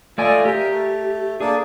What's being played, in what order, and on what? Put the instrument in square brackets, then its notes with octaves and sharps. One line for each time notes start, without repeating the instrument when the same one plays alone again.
[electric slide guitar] A3 D5 G#5 [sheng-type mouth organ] F4 D#5
[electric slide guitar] G4 [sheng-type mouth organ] A#4 E5
[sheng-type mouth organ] A3
[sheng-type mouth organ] A#3 D4 A4 [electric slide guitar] G#4